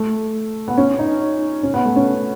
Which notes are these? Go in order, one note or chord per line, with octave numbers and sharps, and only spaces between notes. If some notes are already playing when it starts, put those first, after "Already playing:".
Already playing: A3
B3
C#4
D#4
C#4
B3
A3
C#4